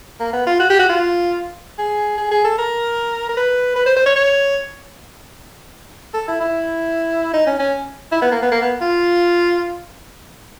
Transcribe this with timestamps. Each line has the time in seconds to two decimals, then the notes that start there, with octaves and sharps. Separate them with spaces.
0.20 A#3
0.33 B3
0.46 F4
0.59 F#4
0.70 G4
0.79 F#4
0.89 F4
1.78 G#4
2.17 G#4
2.31 G#4
2.44 A4
2.58 A#4
3.29 A#4
3.37 B4
3.76 B4
3.86 C5
3.96 C5
4.06 C#5
4.16 C#5
6.14 A4
6.28 E4
6.40 E4
7.33 D#4
7.47 C#4
7.59 C#4
8.12 E4
8.22 B3
8.32 A#3
8.42 B3
8.52 A#3
8.62 B3
8.81 F4